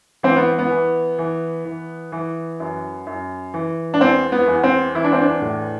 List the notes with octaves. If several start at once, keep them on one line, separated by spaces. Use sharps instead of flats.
E3 C4
B3
B3
E3
E3
E3
E3
F#2
F#2
E3
D4
E2 C4
B3
E2
C4
E3 E4
D4
C4
D4
A2